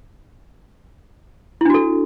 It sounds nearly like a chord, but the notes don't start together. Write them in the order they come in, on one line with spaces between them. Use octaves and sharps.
E4 D4 F#4 A4